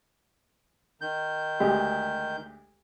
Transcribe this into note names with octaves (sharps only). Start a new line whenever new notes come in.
D#3 G6
D2 G#3 G4